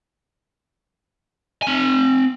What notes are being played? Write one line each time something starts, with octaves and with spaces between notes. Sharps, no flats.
C4 G#5